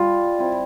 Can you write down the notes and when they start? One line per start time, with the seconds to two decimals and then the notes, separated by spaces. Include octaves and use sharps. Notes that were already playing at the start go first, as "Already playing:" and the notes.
Already playing: G3 F4
0.38 C4 E4